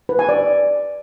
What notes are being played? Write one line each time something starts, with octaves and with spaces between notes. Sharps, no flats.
B4
G#5
D5